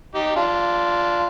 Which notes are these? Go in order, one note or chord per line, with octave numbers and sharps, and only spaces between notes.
D#4 G4
D4 F4